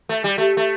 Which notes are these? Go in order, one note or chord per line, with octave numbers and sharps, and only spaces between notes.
A3
G3
A3
A3